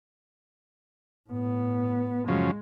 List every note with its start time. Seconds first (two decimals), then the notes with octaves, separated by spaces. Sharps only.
1.30 A2 B3
2.28 F#2 C#3 F3 G#3